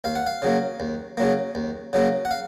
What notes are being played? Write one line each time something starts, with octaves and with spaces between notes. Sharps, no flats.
D#2 F5
F#5
F5
C#3 F#3 A#3
D#2
C#3 F#3 A#3
D#2
C#3 F#3 A#3
F#5
F5